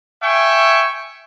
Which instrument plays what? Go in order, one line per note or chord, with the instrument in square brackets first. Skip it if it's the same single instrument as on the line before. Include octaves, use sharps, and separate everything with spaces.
[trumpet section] E5 G5 G#5 C#6